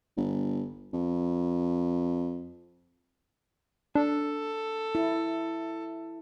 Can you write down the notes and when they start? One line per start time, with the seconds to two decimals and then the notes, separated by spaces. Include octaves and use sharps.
0.17 G1
0.93 F2
3.95 D4 A4
4.95 E4